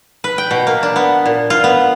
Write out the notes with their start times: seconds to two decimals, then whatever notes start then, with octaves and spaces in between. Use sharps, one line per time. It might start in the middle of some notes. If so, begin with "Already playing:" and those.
0.24 B4
0.38 G5
0.51 B2
0.67 A#3
0.83 D4
0.96 B3
1.26 A#2
1.50 F4
1.64 B3